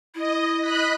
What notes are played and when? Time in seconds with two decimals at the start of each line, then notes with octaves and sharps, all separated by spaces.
0.15 E4 D#5
0.60 D#5 B5 F#6